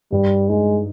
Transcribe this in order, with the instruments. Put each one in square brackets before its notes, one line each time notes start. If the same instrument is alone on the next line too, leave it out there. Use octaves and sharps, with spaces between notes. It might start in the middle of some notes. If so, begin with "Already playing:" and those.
[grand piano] G2 [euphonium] G3
[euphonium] G#3 [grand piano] D#4